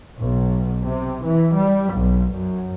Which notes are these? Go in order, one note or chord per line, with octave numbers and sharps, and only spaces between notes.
B1
C3
E3
G3
B1
F#2